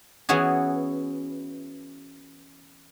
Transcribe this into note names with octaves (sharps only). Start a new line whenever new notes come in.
E3 B3 C#4 E4 F#4 G#4